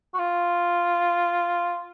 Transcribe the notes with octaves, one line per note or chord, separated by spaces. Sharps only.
F#4
F4